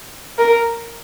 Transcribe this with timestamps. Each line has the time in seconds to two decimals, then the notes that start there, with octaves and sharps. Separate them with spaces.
0.38 A#4